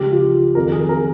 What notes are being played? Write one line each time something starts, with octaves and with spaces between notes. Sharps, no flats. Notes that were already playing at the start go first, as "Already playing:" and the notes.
Already playing: C#2 C#3 F3 G4
F4
F2 D#3 A#4
G#4
A#4